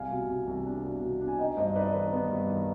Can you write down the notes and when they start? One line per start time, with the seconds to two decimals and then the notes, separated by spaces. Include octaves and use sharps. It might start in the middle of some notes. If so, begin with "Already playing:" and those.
Already playing: C2 F5 G#5
0.11 B2
0.29 B2
0.47 C2
0.66 D4
0.84 B2
1.02 B2
1.21 D4
1.28 G#5
1.39 D#4 D#5 G5
1.57 G2 C5 D#5
1.76 D#4 B4 D5
1.94 D#3 B4
2.12 B3
2.32 G2
2.50 D#3